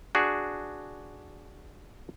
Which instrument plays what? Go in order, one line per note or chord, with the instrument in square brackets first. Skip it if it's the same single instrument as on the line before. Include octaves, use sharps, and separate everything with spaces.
[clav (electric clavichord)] D4 F#4 G#4